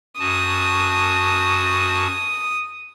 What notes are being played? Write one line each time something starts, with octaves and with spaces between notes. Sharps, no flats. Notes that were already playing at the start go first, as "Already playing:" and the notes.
F#2 F#4 A5 D#6